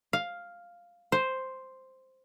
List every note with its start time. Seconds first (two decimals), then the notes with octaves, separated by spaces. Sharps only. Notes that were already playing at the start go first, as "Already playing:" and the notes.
0.13 F5
1.12 C5